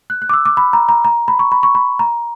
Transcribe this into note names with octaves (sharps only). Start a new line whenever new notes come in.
F#6
F#6
D6
E6
D6
B5
A#5
A#5
A#5
B5
C#6
B5
C#6
B5
A#5